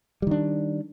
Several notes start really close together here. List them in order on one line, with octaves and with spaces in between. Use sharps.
G3 D#3 D4